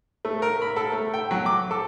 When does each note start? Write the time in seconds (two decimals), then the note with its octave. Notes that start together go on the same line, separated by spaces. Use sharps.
0.25 A3
0.42 A#4
0.62 B5
0.76 A4
0.92 A3
1.14 G5
1.31 F#3
1.46 D6
1.71 A4